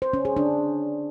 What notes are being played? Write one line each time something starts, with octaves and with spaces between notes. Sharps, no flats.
C5
C#4
G#4
D4